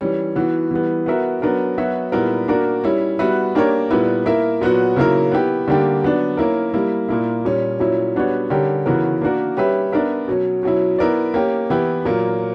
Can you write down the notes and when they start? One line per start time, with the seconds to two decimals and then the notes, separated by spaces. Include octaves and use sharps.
0.01 E3 G3 C#4
0.36 E3 B3 F#4
0.71 E3 G3 B3
1.06 B3 F#4 A#4 E5
1.42 F#3 B3 D4 A#4
1.78 F#3 B3 F#4 C#5 E5
2.12 A#2 G3 B3 E4 A#4
2.48 A#3 D4 F#4 A#4
2.84 G3 C#4 E4
3.19 G3 B3 F#4 B4 E5
3.55 A#3 D4 G4 A#4 C#5
3.91 A#2 G3 B3 E4 B4
4.26 A#3 E4 A#4 E5
4.61 A#2 F#3 B3 F#4
4.96 C#3 F#3 A#3 E4 A#4
5.32 B3 E4 G4
5.68 D3 G3 A#3 D4 G4
6.03 F#3 B3 D4
6.37 A#3 C#4 E4 A#4
6.74 G3 A#3 E4
7.09 A#2 A#3 E4
7.45 A#2 G3 C#4
7.80 A#2 F#3 C#4 E4
8.16 G3 B3 D4 F#4 C#5
8.50 D3 G3 C#4 G4 A#4
8.86 C#3 E3 B3 F#4 A#4
9.21 A#3 D4 F#4 A#4
9.57 G3 C#4 G4 B4 E5
9.93 B3 D4 A#4 E5
10.28 B2 F#3 C#4
10.63 B2 F#3 C#4 E4
10.98 B3 E4 A#4 D5
11.34 A#3 C#4 G4
11.70 E3 B3 E4 G4
12.05 A#2 F#3 A#3